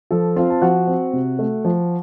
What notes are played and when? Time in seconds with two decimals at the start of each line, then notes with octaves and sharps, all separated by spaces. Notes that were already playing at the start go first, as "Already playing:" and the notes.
0.11 F3 A4
0.36 C4 F4 F5
0.50 A5
0.61 F3 F#4 F#5
0.87 C4
1.13 C3
1.39 A3
1.65 F3